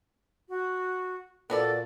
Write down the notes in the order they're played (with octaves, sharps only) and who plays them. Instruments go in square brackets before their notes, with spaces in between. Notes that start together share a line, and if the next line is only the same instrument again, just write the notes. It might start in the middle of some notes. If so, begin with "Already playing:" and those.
[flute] F#4
[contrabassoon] A#2 [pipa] B3 F#4 D5 [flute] A4